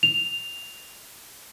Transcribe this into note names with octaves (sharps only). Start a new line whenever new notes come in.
F7